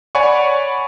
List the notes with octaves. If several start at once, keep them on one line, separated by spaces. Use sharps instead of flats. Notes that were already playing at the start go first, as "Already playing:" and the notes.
C#5 D5 F#5 G#5 B5 C#6